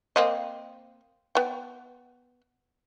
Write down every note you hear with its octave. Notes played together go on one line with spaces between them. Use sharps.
A#3 C4 D#5
B3 G5